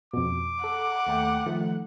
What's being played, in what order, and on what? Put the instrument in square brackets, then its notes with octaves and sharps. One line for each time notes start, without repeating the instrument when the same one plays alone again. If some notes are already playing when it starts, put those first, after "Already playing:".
[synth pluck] F2 B2 [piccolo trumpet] D6
[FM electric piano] A4 [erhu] F#5
[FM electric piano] D#2 A3 G5
D#3 F3 A3